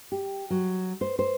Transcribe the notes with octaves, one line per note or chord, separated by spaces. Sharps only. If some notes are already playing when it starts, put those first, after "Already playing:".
G4
F#3
C5
C5